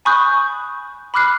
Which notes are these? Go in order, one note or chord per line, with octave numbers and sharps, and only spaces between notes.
G#5 B5 C#6 D#6 F#6 G6
B5 D6 F6 F#6 C7